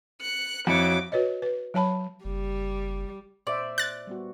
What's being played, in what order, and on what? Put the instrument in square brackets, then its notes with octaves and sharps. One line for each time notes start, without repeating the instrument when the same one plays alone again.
[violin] F#6 C#7
[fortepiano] F2 [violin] E4 D6 [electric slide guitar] F#4 C#5
[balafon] F#4 B4 C#5 D#5
B4
F#3 C#5 A5 B5
[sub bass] F#1 [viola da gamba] G3
[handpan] A#2 C5 E5 [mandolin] D5
[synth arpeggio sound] F#6 A6
[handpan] G3 B3 F#4